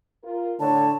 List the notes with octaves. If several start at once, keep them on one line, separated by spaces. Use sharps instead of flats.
F4 A#4
A2 D3 C#5 A5